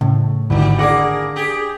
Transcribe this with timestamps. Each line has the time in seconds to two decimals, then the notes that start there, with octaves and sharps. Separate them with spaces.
0.01 A2 C#3
0.50 G#1 D3 D#3 G3 E4 F#4
0.79 A#3 D4 G#4 F#5 D6 A#6
1.36 G4 G#4